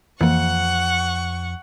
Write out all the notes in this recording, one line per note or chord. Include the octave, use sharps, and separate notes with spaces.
F2 E3 A#3 F#5 C#6